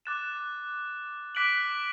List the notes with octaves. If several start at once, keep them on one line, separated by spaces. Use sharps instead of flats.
D6 F#6 A6 E7
D6 F#6 B6 D7 F#7